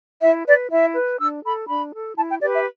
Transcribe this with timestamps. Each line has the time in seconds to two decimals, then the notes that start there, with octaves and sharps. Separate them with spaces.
0.22 E4 E5
0.47 B4 D5
0.71 E4 E5
0.95 B4
1.20 D4 E6
1.44 A4 B5
1.68 D4 B5
1.92 A4
2.17 E4 A5
2.29 G5
2.41 G4 B4 D5
2.54 E5